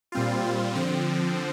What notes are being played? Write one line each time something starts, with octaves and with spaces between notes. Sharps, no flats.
A#2 G3 C4 F4
D3 F3 C4